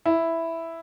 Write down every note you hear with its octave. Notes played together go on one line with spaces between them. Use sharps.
E4